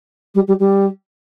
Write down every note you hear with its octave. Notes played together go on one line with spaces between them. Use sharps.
G3
G3
G3